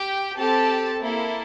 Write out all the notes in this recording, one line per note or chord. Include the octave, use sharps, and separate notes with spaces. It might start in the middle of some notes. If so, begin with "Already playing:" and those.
Already playing: G4 G5
C4 G4 A4 A5
A#3 E4 A4